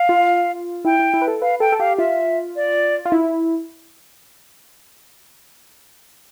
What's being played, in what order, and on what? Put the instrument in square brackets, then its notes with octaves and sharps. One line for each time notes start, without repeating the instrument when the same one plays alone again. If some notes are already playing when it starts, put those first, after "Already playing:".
Already playing: [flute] F5
[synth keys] F4
[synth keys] E4 [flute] G5
[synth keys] E4
E4
B4
A4
[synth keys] B4 [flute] F5
[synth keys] A4 [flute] G5
[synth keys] A4
[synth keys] G4 [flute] F5
[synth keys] F4 [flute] E5
[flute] D5
[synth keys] F4
E4